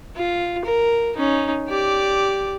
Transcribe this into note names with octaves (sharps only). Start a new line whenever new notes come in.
F4
A#4
C#4 D#4
G4 D5